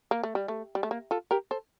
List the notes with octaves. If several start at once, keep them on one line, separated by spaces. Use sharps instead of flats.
A#3
A3
G3
A3
G3
A3
A#3
F4 A4
G4 A#4
A4 C5